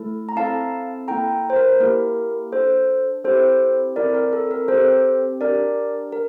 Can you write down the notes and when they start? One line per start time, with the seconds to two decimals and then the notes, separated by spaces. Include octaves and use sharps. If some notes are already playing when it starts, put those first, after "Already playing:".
Already playing: A3 E4 A4
0.29 A#5
0.36 C4 E4 A4 F5 A5
1.08 A#3 E4 A4 G5 A#5
1.50 C5
1.56 A#4
1.80 A#3 E4 G4 A#4
2.52 D4 A4 C5
3.25 C4 E4 G4 A4 C5
3.96 C4 E4 A4 A#4 D5
4.14 A#4
4.33 A4
4.51 A#4
4.68 C4 G4 A4 C5
5.41 D4 G4 A#4 D5
6.12 A#4